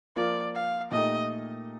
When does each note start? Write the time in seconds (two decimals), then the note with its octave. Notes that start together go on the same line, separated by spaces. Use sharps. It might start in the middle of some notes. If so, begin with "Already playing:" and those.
0.16 F3 A#3 F4 D5
0.55 F5
0.92 A#2 A3 D#4 G4 D#5